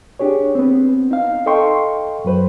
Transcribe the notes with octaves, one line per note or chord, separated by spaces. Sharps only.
D4 G4 G#4 C#5
B3 C4
D#4 F5
A4 D#5 F5 G5 C6 C#6
F#2 F#3 B4 C5